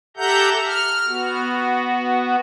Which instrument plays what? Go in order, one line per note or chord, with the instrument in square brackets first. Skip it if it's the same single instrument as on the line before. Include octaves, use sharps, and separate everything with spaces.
[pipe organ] G4 A4 E5 F#5 A#5 G6
F6
B3 F#4